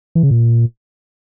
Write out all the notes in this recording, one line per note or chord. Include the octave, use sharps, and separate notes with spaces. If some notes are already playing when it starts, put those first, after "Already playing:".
E3
C#3
A#2